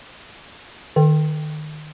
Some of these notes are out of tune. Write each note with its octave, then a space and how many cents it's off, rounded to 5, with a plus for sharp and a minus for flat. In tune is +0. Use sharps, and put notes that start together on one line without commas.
D#3 -30 A4 +10 G5 +0